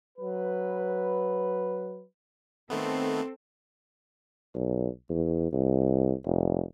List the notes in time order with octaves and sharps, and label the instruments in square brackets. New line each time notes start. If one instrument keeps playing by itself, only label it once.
[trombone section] F#3 B4
[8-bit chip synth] D#3 A3 B3 [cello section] C4 A4
[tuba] B1
E2
C2
F1